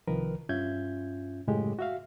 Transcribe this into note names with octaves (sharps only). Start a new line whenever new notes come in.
C2 D#3 F3 A#4 B4
G2 C#4 F4 E5 G6 G#6
F#2 A2 C#3 F#3 G#3 G4
F#4 E5 F5